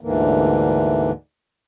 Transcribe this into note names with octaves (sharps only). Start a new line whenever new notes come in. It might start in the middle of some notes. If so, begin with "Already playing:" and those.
D2 G#2 D3 E3 A#3